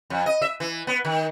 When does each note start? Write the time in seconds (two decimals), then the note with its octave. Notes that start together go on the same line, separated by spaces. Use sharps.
0.10 F2
0.26 D#5
0.42 E5
0.60 E3
0.87 B3
1.05 D#3